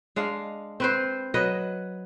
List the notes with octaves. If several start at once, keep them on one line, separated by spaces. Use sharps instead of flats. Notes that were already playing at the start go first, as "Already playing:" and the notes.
G#3 D4 F5
C4 B4 C5
F#3 B4 D#5